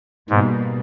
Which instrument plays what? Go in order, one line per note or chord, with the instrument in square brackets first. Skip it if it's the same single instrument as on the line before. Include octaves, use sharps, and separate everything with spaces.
[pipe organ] G#2 [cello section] B2 G3 A#3